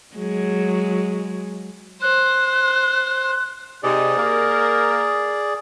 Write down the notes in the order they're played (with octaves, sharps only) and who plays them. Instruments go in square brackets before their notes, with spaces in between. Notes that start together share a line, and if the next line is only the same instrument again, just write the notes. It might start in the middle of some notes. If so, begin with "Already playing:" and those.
[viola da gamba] F#3 G#3
[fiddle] C5 [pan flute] F#6
[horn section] C3 D#4 [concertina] G#4 D5
[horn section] A#3 A#4